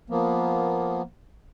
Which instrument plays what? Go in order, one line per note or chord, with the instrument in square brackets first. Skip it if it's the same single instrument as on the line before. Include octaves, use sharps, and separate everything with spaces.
[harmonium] F3 A#3 B3